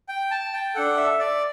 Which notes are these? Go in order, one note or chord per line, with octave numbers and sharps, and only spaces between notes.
G5
A5
G5
D4 A4 F#5
E5
D5